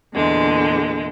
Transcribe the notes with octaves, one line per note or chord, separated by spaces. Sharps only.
E2 A#2 D3 G#3